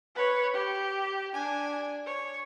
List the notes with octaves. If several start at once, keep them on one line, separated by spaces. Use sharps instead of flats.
B4 C#5
G4
D4 G#5
C#5